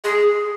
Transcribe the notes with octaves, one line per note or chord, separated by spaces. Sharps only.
G#4